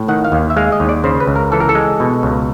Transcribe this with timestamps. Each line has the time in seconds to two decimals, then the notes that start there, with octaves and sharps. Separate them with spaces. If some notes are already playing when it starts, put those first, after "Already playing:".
Already playing: A2
0.08 D#3 F#5
0.25 F5
0.32 D#2
0.50 E5
0.57 G#3 F5
0.72 D#5
0.80 D#2
0.89 D5
1.04 C#3 C5
1.20 B4
1.27 C#2
1.36 A#4
1.52 E3 A4
1.60 A#4
1.69 A4
1.75 G#3
2.00 B2
2.23 C#2